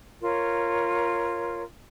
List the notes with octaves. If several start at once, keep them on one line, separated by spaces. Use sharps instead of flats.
F4 A#4 C#5